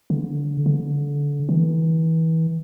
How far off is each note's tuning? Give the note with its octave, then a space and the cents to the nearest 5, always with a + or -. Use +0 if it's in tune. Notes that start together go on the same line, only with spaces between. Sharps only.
D3 -20
D3 -25
E3 -30